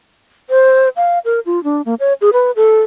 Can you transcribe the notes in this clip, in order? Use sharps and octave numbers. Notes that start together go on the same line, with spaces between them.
C5
F5
A#4
F4
D4
A#3
C#5
G#4
B4
A4